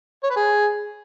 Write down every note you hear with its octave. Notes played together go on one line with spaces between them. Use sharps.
C#5
B4
G#4